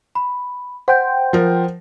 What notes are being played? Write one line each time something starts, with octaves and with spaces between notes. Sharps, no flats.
B5
C5 F#5 G5 G6
F3 A#4